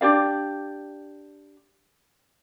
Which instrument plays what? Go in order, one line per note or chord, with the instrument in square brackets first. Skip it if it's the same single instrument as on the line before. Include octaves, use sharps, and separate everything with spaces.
[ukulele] D4 G4 D5 F5